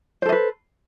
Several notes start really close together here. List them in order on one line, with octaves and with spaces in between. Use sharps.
C5 A4 D#5 B4